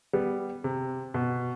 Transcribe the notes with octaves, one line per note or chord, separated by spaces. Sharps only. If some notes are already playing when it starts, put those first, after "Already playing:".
G3 B3
C3
B2